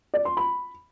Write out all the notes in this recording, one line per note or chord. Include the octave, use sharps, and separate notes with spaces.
D5
C6
B5